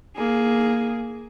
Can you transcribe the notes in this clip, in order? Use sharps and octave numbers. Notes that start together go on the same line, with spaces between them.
A#3 G#4